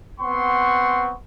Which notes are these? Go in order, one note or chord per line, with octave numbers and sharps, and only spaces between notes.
B3 C4 F#5 C6 C#6